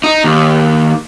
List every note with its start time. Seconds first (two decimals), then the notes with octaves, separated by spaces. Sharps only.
0.04 D#4
0.24 D#2